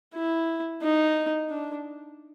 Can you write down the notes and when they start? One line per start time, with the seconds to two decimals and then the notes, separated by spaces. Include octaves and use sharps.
0.15 E4
0.82 D#4
1.50 D4